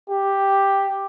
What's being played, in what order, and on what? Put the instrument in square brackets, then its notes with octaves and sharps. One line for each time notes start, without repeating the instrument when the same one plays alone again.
[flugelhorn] G4